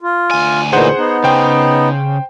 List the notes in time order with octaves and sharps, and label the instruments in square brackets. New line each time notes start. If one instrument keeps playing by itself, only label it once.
[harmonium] F4
[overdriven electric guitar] D2 G#5
[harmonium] A#2 E3 D#4 [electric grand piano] G#4 C5 F#5
[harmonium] B3 D#4
[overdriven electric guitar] C#3 [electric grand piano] C5 G5